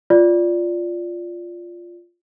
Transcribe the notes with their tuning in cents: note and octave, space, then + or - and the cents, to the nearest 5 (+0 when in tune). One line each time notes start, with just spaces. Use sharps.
F4 +0 D5 -5